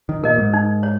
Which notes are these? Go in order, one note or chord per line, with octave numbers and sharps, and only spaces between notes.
D#3
A#2 A#4 D#5
G#2
D#4
C#5